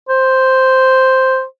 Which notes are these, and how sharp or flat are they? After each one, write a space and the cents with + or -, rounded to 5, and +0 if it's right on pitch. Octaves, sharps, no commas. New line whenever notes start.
C5 +0